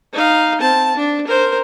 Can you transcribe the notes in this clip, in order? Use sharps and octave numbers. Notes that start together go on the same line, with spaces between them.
D#4 F5
C4 A5
D4
A#4 C5